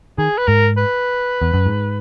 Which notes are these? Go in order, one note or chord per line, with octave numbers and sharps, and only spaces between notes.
D#3 G#4
B4
G#2 A#4
B4
E2
F#2
G#2